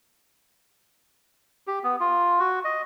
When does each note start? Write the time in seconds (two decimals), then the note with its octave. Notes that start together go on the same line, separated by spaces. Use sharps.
1.67 G4
1.84 B3
2.00 F4
2.40 F#4
2.65 D#5